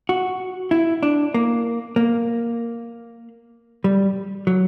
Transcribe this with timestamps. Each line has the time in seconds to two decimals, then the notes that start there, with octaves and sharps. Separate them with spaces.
0.09 F#4
0.71 E4
1.03 D4
1.34 A#3
1.96 A#3
3.84 G3
4.47 F#3